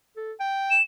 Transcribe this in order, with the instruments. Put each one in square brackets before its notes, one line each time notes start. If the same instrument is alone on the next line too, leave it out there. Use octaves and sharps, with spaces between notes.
[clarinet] A4
G5
[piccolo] E7